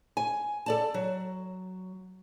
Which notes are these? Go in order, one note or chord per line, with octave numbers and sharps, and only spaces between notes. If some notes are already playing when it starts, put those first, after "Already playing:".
G#5
A4 D5 A5
F#3